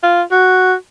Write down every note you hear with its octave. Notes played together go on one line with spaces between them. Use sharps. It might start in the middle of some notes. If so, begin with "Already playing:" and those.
F4
F#4